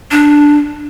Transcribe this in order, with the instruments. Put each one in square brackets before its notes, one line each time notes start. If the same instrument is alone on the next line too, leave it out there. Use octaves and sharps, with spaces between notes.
[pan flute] D4